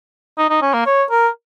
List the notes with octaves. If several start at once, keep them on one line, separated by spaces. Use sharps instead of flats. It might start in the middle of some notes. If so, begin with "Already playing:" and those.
D#4
D#4
C#4
A#3
C#5
A#4